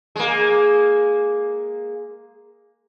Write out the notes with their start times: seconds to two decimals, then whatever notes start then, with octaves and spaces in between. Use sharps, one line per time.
0.16 G#3 A#3